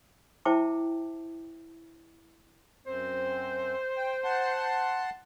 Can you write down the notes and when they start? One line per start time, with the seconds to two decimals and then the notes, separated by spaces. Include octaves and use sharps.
0.45 E4 C5 E5 G5 A5 D6
2.86 F#2 C4 C5
3.97 G5
4.24 F#5 A5 C6